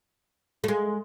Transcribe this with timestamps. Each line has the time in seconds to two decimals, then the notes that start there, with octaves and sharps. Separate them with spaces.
0.64 A3
0.68 G#3